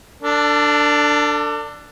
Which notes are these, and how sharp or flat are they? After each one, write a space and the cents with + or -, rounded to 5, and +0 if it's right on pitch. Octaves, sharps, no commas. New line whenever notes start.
D4 +0 A4 +35